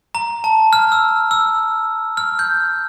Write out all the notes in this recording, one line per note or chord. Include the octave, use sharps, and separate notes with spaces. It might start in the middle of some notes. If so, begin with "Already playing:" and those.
A#5
A5
F6
E6
E6
F6
G6